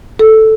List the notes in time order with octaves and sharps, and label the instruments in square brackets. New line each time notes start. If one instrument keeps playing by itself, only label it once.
[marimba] A4